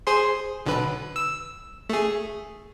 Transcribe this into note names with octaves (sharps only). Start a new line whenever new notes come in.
G#4 C5 C6
B1 D3 B4
E6
A3 G#4